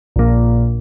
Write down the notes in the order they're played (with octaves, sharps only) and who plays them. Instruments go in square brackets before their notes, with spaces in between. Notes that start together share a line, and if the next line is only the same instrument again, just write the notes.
[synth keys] A#1 A#2